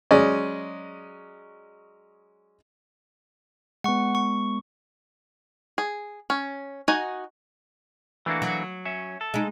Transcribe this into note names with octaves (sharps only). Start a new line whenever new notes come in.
F#3 G#3 C#4 D5 D#5
G#3 B3 F#5 C#6
C#6
G#4
C#4
D#4 F#4 D#5 G#5
E3 A3 A#3 D4 E4 F#4
F#3
C#4 E5
A4
G#3 D#4